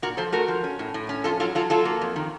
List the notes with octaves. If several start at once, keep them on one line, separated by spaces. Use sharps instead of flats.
A#2 F#4 A#4
F3 A4 C5
A3 F#4 A#4
F3
C#4
A2
A2
C#4
F2 F4 A4
F#3 F4 A4
F#3 F4 A4
F#3 F4 A4
A#3
F2
D#3